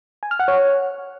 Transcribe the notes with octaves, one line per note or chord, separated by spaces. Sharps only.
G#5
F6
F#5
C#5